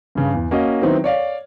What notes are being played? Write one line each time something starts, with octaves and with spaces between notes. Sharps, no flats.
G2 C#3
E2
A#3 C#4 F#4 D#5
D#3 F#3 B3 C4 D#4 E4
C#5 D5 F5